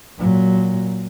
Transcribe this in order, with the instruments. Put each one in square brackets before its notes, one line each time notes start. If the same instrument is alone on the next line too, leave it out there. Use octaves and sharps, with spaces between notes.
[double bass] A#2 F#3